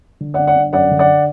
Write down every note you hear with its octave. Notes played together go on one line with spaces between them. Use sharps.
D3
D5 F#5
G1
D5 F#5
G1
F#2 D5 F#5
D3
D5 F#5